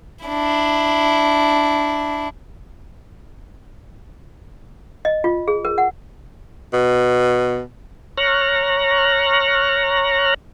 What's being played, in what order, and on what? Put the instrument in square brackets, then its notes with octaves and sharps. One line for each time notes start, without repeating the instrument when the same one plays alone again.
[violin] D4 E4
[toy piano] D#5
F4
G#4
A#4
F#5
[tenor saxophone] B2
[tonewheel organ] C#5 A#5 C#6 F6 F#6 A#6